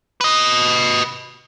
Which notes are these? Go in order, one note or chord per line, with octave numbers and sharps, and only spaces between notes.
B4 D#5